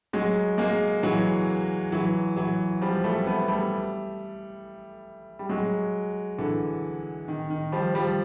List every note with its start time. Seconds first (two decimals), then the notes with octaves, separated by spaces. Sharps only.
0.13 F#3 G#3
0.58 G#3 A#3
1.03 E3 F#3
1.92 E3 F#3
2.36 E3 F#3
2.82 F3 G3
3.04 G3 A3
3.26 A3 B3
3.48 G3 A3
5.39 G3
5.49 F#3 G#3
6.38 D3 E3
7.28 D#3
7.50 D#3
7.72 F3 G3
7.95 F3 G3